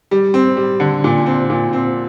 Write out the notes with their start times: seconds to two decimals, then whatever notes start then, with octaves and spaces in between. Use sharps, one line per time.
0.11 G3
0.34 C4
0.57 G3
0.80 D3
1.04 A#2
1.26 C4
1.50 A#2
1.73 C4